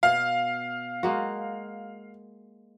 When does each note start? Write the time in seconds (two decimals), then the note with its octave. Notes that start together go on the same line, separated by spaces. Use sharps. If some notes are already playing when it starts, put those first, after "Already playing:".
0.03 B2 F5
1.03 G#3 A#3 F#4